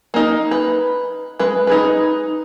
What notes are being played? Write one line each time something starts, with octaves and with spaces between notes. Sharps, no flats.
A#3 D#4
B4
G#3 B4
D#4 G#4 B4